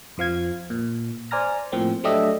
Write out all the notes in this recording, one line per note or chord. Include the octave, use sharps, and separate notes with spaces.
F2 F3 F5 G#6
A#2
C5 D5 G#5 A#5 F6 A#6
A2 F3 A#3 C4
F#3 A3 D4 G4 D#5 E5